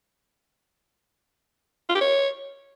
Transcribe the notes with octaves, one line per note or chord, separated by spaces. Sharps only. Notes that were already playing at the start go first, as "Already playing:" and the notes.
F4
G4
C#5